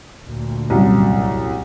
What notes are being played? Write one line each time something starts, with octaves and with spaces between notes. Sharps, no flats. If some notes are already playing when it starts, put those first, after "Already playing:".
D2 A#2
C2 F#2